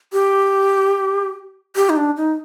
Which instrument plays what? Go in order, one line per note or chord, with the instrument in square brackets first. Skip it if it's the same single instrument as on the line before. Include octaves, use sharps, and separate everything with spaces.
[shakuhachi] G4
G4
D#4
D4
D#4